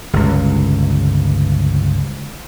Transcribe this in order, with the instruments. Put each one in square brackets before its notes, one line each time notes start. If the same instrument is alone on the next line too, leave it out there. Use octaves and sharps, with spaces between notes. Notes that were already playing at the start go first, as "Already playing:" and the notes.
[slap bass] G1 C#2